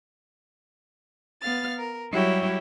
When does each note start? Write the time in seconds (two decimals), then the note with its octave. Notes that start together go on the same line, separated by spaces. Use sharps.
1.41 B3 F5 F6 A6
1.79 A#4
2.11 F#3 G3 E4 F#4 G4 C#5